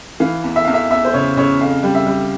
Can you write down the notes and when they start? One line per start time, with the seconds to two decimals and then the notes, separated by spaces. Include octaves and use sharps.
0.20 E3 F5
0.44 E2
0.56 E5
0.64 E2 F5
0.74 E5
0.91 E2 E5
1.05 C5
1.14 C#3 C#5
1.37 C#3 C#5
1.60 F2 F5
1.83 G3
1.95 E5
2.07 G3